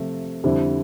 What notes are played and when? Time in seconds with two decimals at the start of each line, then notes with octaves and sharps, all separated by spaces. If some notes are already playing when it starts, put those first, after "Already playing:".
Already playing: C3 F3 A3
0.44 F2 D3 G3 C4 E4